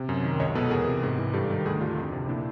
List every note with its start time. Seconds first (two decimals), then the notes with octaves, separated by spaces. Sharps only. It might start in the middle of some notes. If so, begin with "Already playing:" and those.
Already playing: C3
0.09 F#2
0.23 D#3
0.40 C#2 C#5 D#5
0.55 B2 A4 B4
0.70 E2 G#4 A#4
0.87 C3
1.03 G#2
1.18 E3
1.33 G2 G4 A4
1.50 D#3
1.65 D2 F#4 G#4
1.81 D3 F4 G4
1.97 F2
2.12 C3
2.28 A#2 D4 E4